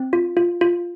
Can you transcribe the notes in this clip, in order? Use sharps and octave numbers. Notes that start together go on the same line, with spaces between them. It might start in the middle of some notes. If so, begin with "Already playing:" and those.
Already playing: C4
F4
F4
F4